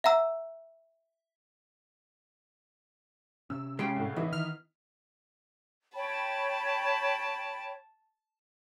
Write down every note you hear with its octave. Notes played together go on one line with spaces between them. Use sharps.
E5 F#5 A#5 E6
C3 C#4 E6
C#3 G#3 G4 G5 C7
C2 A2
E3 B3 D#4 E4
D#3 F6
C#5 G5 A5 B5